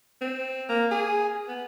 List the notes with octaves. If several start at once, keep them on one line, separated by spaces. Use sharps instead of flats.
C4
A#3
G#4
B3